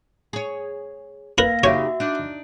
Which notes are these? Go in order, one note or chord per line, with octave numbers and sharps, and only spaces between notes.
G#4 C#5
A#3 A#4 B4 F5 A#6
C#3 D#4 F#4 G4 C#5 E5
D4 D#4